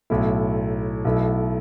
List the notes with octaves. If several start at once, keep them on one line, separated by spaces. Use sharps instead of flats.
B1 A2 A3 E4
B1 B2 A3 E4